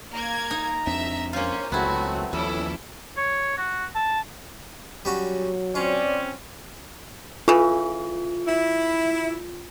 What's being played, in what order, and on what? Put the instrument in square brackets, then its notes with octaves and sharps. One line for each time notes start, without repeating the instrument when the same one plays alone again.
[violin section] A#3 G#6 [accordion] A#5
[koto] D#4
[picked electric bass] F2 C4 D4 [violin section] E5
[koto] A#3 F4 [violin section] C#4 [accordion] C5
[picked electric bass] C#2 [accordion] F#3 A3 C4 [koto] B3 E4 [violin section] F#4
[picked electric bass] D#2 F3 [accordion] E3 E6 [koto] G3 [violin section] C#4 E4 A4
[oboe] C#5
F#4
A5
[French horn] F#3 [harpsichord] G3 C#4 F#4
[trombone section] C4 C#4 [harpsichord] F4 [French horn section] C#5 D5
[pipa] C#3 E3 [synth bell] F4
[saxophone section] E4